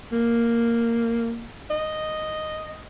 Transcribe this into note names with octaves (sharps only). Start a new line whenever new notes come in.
A#3
D#5